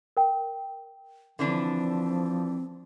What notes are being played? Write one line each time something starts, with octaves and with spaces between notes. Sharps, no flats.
A#4 G5
D3 E3 F3 C4 D4